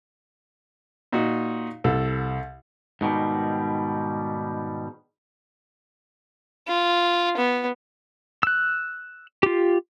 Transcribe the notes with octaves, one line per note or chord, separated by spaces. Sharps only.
A#2 D#4 F#4
C2 A4
G#2 B2 D#3 G3
F4
B3
E6 F#6
F4 G4